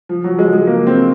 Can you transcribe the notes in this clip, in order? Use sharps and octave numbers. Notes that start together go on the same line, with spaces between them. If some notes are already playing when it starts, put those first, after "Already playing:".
F3
F#3
G#3
G#3
A#3
C4